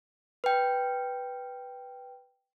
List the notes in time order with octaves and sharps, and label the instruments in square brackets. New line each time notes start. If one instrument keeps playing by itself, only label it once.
[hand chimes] B4 G5